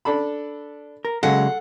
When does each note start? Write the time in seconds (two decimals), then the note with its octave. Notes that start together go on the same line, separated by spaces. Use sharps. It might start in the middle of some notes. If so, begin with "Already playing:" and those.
0.05 D4 A4 B5
1.05 A#4
1.23 C#3 F#3 G#3 A4 F5 F#5